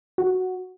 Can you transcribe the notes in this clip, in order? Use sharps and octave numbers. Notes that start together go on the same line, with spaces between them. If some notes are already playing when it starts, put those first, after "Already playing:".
F#4